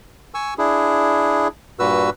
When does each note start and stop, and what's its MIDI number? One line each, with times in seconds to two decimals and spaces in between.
0.34 0.54 80
0.34 0.54 85
0.34 0.54 88
0.58 1.48 62
0.58 1.48 64
0.58 1.48 68
1.79 2.10 43
1.79 2.10 46
1.79 2.10 66
1.79 2.10 71
1.79 2.10 88